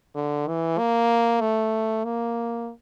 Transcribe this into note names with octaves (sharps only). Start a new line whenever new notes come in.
D3
E3
A#3
A3
A#3